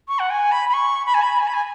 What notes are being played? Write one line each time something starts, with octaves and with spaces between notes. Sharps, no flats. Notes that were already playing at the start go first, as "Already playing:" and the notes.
C#6
F#5
G#5
B5
B5
C#6
B5
G#5
B5
G#5
B5
G#5